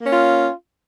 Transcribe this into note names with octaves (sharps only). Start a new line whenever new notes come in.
A#3 C#4 F4